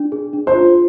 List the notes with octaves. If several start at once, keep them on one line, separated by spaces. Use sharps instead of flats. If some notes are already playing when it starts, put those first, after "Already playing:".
Already playing: D4
G#4
D4
C5
F4